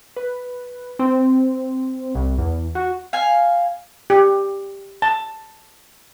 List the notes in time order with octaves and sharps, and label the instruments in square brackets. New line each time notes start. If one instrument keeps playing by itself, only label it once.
[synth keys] B4
C4
C2
E2
F#4
[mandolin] F5 G#5
[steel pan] G4
A5